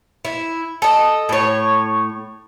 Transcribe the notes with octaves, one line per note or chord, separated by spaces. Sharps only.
E4
A4 D#5
A2 C#5